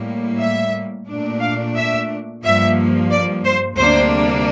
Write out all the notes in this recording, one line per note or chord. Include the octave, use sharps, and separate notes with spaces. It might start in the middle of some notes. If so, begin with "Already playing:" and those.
Already playing: A2 G3 A#3
E5
A#2 A3 D4
F5
E5
G2 F3 A#3 E5
D5
C5
D2 C3 G3 A#3 D4 C5